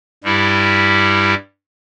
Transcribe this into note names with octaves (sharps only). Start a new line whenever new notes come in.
G2 G3 E4 G4